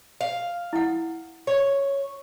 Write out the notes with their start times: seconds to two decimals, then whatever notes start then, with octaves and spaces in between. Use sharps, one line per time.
0.21 F5
0.73 E4 F#5
1.47 C#5